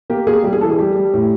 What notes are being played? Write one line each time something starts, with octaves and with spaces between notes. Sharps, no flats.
A#3 G4
A#3 G#4
G3 G4
G#4
E3 A4
G#4
G3 G4
G3
A2